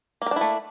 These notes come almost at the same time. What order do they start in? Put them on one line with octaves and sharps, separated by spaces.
A#3 A#4 D4 E4 A3